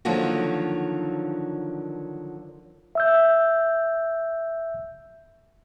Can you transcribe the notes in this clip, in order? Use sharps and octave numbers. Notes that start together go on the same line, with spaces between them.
D3 D#3 F3 F#3 A#3 F#4
E5 E6 G6